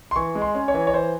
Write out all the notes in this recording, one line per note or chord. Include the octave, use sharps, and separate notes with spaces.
C6
E3 C#6
G#3
C6
C#4
C#5
E3
C#5
E3 C5